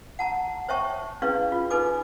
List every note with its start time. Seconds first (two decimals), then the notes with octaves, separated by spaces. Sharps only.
0.19 F#5 A5 A#5
0.69 C5 C#5 E5 G5 A5 C#6
1.22 C#4 E4 G#4 B4 D5 F5
1.52 F4
1.70 D#4 A4 B4 G#5 D6